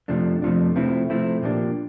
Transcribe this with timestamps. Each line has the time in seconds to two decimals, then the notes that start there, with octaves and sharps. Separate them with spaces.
0.08 F2 C3 F3 A3 D4
0.42 F2 C3 F3 A3 D4
0.75 C3 F3 A3 C4 E4
1.10 C3 F3 A3 C4 E4
1.42 A#2 F3 A#3 D4 G4